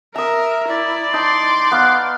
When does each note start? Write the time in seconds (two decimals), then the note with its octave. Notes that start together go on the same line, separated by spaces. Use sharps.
0.16 A#4 E5 A#5 D#6
0.68 E4 D5
1.13 D#4 A5 C6 D6
1.71 B3 F5